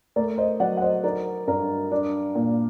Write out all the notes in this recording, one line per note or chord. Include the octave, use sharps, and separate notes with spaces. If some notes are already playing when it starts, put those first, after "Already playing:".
A3 A#4 D5
C5 D#5
F#3 D5 F#5
F#5
C5 D#5
D#4 A#4 D5
G2 A#4
D4
A#2